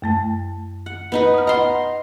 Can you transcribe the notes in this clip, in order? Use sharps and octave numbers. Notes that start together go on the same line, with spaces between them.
F#2 A3 A5
F#5
B3 D#4 B4
D#6 F6
D#5 F#5 A#5 C6